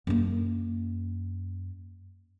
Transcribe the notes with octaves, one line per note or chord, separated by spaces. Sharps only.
F#2 A#3